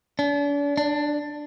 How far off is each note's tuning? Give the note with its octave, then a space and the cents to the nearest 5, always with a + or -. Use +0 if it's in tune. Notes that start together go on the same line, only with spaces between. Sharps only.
D4 -40
D4 +10